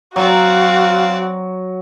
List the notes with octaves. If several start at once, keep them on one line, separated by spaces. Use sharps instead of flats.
F#3 C4 F#4 D5 F5